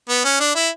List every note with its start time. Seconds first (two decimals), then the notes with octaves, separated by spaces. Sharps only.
0.09 B3
0.25 C#4
0.40 D4
0.55 E4